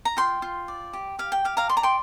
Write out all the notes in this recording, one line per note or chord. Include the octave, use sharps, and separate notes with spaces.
A#5
F4 G5 C6
F4
D5
G4
G4 F5
G5
G4 F5
F5 A#5
D5 C6
A#5
G5 C6